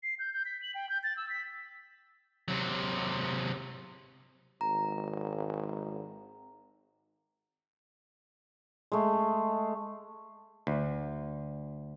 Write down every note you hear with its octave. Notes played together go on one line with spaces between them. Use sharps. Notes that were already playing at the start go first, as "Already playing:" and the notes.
C7
G6
G6
B6
F#7
G5
G6
A6
E6
B6
C3 F#3
G#1 A#5
G#3 A3
D2